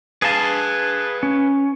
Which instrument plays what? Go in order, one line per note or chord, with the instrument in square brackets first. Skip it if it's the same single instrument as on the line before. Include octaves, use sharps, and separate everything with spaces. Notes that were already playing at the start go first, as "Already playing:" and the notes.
[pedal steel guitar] G#4 A5 [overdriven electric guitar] B4 F5
[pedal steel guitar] C#4